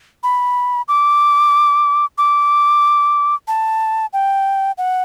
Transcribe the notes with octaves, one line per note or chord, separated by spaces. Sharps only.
B5
D6
D6
A5
G5
F#5